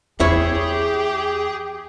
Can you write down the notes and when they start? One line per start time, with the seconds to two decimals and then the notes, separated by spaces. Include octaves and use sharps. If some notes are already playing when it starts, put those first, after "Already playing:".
0.20 E2 E4 G4 G#4 C#5